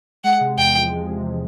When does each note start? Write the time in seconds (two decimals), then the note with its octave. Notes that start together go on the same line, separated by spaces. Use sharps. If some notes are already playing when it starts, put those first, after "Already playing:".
0.24 G#3 F#5
0.41 C3
0.57 E2 G5
0.74 F3
0.91 G#3
1.08 C3